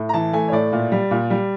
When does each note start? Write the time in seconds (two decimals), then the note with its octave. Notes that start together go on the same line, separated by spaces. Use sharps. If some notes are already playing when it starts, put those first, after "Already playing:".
Already playing: A2
0.09 A#5
0.14 E3 A5
0.33 A3 G#5
0.48 C#5
0.52 A2 D5
0.73 A#2
0.92 G3
1.11 A#2
1.30 G3